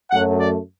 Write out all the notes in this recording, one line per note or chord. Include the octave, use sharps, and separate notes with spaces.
F#2 F#3 A3 F#5
D5